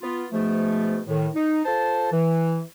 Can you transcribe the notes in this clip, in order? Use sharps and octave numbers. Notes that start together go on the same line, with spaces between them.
B3 F4
G#2 B2 F3 A3
A2 D#3
D#4
F4 A4 C5 A5
E3